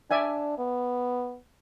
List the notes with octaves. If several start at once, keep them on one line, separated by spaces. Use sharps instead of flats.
D4 D5 E5 G#5
B3